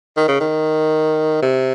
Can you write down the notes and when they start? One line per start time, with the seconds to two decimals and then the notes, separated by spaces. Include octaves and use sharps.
0.17 D#3
0.28 C#3
0.40 D#3
1.42 C3